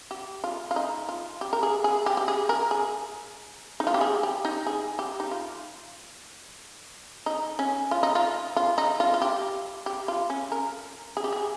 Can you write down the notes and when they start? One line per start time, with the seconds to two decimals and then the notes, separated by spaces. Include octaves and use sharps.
0.11 G4
0.44 F4
0.71 F4
0.76 D#4
1.09 F4
1.41 G4
1.53 A#4
1.63 G#4
1.84 G#4
2.06 G4
2.17 G4
2.28 G#4
2.49 A#4
2.71 G#4
3.80 D#4
3.87 F4
3.94 G4
4.01 G#4
4.23 G4
4.45 D#4
4.67 G#4
4.99 G4
5.20 D#4
5.31 F4
7.26 D#4
7.59 C#4
7.91 F4
8.03 D#4
8.15 F4
8.56 F4
8.78 D#4
9.00 F4
9.14 F4
9.22 G4
9.86 G4
10.08 F4
10.30 C#4
10.52 A#4
11.17 G#4
11.24 G4
11.32 G#4